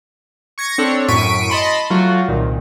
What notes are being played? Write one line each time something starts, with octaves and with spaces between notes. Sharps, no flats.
C#6 G#6 A#6 C#7
C4 D4 A4 C#5
F#2 A2 C#6 B6 D7 D#7
D#5 A5 B5 C6
F#3 A3 F4 F#4
C2 A#2 D#3